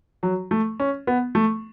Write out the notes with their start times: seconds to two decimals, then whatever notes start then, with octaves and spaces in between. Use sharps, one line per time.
0.23 F#3
0.51 A3
0.80 C#4
1.07 B3
1.35 A3